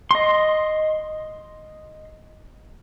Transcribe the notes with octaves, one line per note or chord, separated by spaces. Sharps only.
D#5 C6